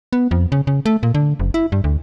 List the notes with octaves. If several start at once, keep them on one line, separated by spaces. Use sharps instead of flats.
B3
F2
C#3
C#3
A3
A#2
D3
F#1
E4
G2
D2